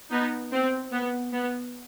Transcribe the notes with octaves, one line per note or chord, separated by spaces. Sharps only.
B3 D#4
C4
B3
B3